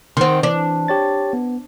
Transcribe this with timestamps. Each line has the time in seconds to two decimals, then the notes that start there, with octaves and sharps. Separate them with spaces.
0.17 D#3 C4 F#5 C6
0.43 E3 D4
0.88 G4 C#5 A6
1.33 B3